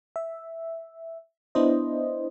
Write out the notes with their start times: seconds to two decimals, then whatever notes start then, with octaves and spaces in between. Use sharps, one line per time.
0.16 E5
1.55 B3 D4 E4 C5 D#5